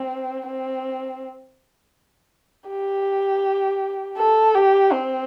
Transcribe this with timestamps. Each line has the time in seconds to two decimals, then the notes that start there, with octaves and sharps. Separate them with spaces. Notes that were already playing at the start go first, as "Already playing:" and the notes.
Already playing: C4
0.47 C4
2.69 G4
4.18 A4
4.55 G4
4.92 C4